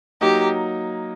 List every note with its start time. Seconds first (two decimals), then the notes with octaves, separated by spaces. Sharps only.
0.21 F#3 A#3 D#4 G4